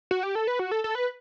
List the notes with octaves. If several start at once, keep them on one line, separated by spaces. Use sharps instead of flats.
F#4
G4
A4
B4
F#4
A4
A4
B4